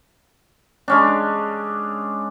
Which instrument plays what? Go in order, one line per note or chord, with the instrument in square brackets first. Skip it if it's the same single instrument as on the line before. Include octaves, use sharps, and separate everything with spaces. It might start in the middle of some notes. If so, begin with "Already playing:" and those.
[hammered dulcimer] G#3 C#4 D4